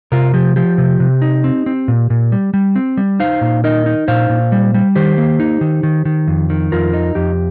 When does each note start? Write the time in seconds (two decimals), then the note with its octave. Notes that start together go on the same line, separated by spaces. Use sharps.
0.12 C3 F4 A#4
0.34 F3 G4
0.56 F3 G4
0.78 C3
1.00 C3
1.22 D#4
1.44 C4
1.66 C4
1.88 A#2
2.10 A#2
2.32 G3
2.54 G3
2.76 C4
2.97 G3
3.20 D#4 C5 F5
3.41 A#2
3.64 D#4 A#4 D#5
3.86 D#4
4.08 A#2 C5 F5
4.29 A#2
4.52 G3
4.74 G3
4.96 D#3 G4 C5
5.18 A#3
5.40 D#4
5.61 D#3
5.83 D#3
6.05 D#3
6.27 F2
6.50 D#3
6.72 F2 F4 A#4
6.93 D#4
7.15 F2 G4